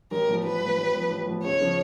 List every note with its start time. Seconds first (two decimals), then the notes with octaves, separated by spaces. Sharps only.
0.11 A1 A#4
0.28 A2 F3
0.44 A1 B4
0.60 A2 F3
0.77 A1
0.94 A2 F3
1.10 A1
1.26 A2 F3
1.43 C#2 C#5
1.60 C#3 F3